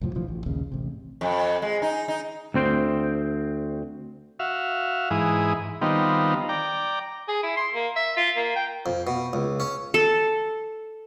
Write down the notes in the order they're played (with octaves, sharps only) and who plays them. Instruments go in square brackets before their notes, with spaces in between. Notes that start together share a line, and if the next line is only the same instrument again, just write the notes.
[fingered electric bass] C2 F#2 A2 F3
B1 D3 E3 F3
A1
A#1 D#2 C#3
A1 C3
[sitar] F2
G#3
D#4
D#4
[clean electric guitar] D2 C4 C5 G5
[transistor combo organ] F#4 E5 F5
G#2 E3 E4 G#4 D#6
D#3 G3 B3 C4 D#4 F4
D5 G5 A#5
[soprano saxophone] G#4
E4
C6
A#3
E5
F4
A#3
G5
[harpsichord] F2
B2
C#2
C#4
[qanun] A4